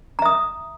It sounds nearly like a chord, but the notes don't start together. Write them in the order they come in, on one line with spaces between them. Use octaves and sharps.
A#5 E5 D#6